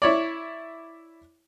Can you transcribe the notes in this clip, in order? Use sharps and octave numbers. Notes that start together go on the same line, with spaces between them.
E4 C#5 D5